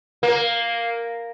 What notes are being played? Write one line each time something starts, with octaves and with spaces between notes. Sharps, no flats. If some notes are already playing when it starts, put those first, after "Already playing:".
A#3